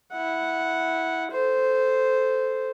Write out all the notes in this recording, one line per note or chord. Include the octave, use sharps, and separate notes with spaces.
E4 F#5
A4 C5